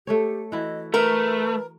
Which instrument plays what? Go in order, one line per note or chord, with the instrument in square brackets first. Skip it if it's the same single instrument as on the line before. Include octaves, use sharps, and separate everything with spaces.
[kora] A3 A4 C#5 [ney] G4
[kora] E3 E4 F#4 [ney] D#5
[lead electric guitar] A3 [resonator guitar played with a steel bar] A#4 [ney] B4